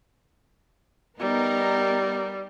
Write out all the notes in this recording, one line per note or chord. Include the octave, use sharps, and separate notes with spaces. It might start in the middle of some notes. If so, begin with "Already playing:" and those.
G3 B3 D#4 A#4